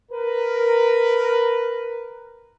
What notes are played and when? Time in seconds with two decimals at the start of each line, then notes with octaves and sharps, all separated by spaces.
0.12 A#4 B4